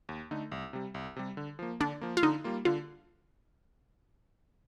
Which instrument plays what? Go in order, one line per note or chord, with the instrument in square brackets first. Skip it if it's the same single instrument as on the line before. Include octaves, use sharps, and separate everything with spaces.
[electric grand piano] D#2
D3 A3 D#4
C2
C3 G3
C2
C3 G3
D3
F3 A#3
[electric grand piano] D3 [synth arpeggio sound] D4
[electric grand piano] F3 A#3
[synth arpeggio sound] F4
[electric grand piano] D3 [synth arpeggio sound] D#4
[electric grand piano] G3 A#3 F4
[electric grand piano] D3 [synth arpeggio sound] F4